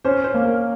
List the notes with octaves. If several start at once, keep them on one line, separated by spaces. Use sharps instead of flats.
C#4 C5
C5
A#3
A#4